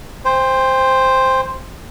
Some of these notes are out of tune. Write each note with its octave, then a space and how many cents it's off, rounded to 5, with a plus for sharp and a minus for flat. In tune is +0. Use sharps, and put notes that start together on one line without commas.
C5 +0 G5 +35